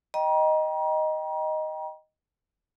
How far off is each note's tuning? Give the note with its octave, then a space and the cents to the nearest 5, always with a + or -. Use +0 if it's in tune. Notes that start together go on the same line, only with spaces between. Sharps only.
D#5 +0 G5 +0 A#5 +35